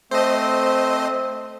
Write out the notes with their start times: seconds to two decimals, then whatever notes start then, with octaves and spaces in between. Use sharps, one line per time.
0.11 A3 C4 C5 D#5